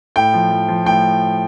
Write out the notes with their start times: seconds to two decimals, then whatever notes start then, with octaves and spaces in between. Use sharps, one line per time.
0.16 A2 G5
0.33 F3
0.51 F3
0.68 F3
0.86 A2 G5